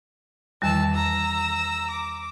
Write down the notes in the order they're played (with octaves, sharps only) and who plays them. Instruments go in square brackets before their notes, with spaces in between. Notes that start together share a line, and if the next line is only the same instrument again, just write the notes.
[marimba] E2 D#3 G3 [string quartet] E3 A5 E6
[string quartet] A#5 E6
D6